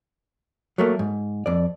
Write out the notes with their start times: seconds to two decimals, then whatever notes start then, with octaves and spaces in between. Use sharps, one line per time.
0.78 F#3 A3 A#3
0.99 G#2
1.46 F2 D5